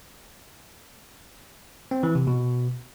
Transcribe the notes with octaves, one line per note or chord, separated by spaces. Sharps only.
C4
E3
C3
B2